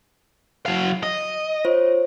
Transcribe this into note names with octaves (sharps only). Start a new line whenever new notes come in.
F#3 F5
D#5
F4 C5 C#5